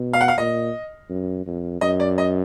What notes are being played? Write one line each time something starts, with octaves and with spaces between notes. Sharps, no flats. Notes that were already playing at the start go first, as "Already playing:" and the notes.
Already playing: B2
F5
F#5
F5
A#2 D#5
F#2
F2
F#2 D#5
D5
D#5